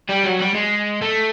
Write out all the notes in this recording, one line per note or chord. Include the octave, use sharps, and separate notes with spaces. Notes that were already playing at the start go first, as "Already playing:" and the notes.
G3
F#3
G3
G#3
A3